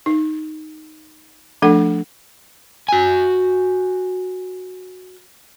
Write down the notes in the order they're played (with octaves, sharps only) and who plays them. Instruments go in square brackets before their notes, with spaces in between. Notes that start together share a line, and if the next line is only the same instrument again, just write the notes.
[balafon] D#4
F3 A3 D4 A4 F#5
[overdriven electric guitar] F#4 G#5